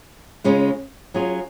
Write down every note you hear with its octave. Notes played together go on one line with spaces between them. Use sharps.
C#3 G#3 C#4 F4
F#3 C#4 F4 G#4